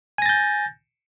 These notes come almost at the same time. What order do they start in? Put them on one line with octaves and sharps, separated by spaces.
G#5 A#6 A6 G6